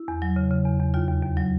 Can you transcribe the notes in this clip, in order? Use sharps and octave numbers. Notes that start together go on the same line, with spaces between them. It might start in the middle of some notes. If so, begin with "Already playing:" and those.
Already playing: E4
E2
F#3
C#3
C#3
E2
E2
D#2 F4
D#2
D#2
F#3